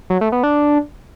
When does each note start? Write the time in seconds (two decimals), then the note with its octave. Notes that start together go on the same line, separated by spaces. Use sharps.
0.10 F#3
0.21 A3
0.32 B3
0.43 D4